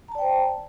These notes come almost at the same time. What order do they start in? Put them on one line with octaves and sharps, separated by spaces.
A#5 A5 D5 G5 C5